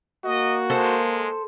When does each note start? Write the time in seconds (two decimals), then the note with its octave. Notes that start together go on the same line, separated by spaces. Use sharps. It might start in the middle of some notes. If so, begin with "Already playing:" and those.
0.25 A#3 F#4 D#5
0.70 G#3 A4 C5